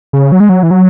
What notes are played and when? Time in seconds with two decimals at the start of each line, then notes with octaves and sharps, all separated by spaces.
0.13 C#3
0.32 F#3
0.40 G#3
0.49 F#3
0.63 E3
0.71 F#3